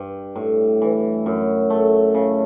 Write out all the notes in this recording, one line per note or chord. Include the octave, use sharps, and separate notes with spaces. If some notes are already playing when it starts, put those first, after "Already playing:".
Already playing: G2
A2
E3
F#2
A3
C#3